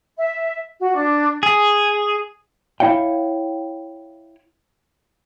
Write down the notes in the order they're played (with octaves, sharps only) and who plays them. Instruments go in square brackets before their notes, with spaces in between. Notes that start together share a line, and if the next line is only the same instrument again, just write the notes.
[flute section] E5
F#4
D4
[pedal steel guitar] G#4
[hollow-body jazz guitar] E4 C#5 F5 G5